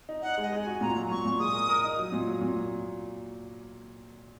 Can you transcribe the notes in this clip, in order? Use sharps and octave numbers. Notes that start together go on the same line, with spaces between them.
D#4
D#4 F#5
G#3 D#5
G#3
F#4 G#5
A#2 A#5
F#3
A#2 C#6
A#2
G#3 D#6
A#4
A#4
D#4
F#3
A#2
F#3
A#2